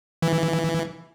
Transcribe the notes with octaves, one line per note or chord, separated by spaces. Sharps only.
E3